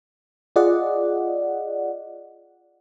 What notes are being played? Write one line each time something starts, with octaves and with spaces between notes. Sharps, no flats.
F4 G#4 D5 D#5 F#5